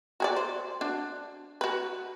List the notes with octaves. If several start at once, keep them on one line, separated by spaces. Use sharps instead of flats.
F#4 G#4 D5
C5
D4 F#4
F#4 B4